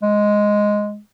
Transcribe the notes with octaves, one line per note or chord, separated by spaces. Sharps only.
G#3